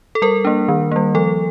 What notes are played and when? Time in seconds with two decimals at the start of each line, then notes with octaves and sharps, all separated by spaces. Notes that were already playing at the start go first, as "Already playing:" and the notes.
0.15 A4
0.22 G3 A#4
0.45 A#3 D4
0.68 D#3
0.91 G3 A#3
1.15 F3 A4